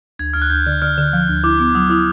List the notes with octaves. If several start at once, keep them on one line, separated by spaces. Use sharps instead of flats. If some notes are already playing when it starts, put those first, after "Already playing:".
D2 G#6
D2 F6
F#6
D2 G6
D3
D3 F6
D3
F3
D2
E4 D6
B3 D6
F#3 D#6
E4 D#6